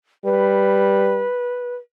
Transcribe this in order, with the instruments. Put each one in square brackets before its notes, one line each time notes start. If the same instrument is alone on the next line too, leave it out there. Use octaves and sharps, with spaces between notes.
[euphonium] G3 [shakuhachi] B4